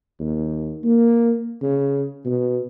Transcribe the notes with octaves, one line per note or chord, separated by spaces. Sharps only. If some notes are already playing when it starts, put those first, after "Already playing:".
D#2
A#3
C#3
B2